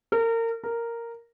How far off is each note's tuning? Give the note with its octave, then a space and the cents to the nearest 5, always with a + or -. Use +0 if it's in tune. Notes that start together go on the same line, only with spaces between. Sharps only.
A#4 -30
A#4 -5